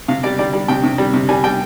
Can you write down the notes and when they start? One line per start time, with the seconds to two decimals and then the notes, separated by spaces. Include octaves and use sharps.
0.08 C3 F5
0.23 G3 D5
0.38 G3 D5
0.53 G3
0.68 C3 G5
0.84 C3
0.98 G3
1.13 C3
1.29 G3 G#5
1.44 G3 G5